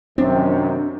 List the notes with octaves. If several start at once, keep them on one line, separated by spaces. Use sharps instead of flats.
F#2 C3 D#3 C4 D4